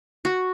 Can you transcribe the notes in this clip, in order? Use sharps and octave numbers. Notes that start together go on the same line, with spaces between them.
F#4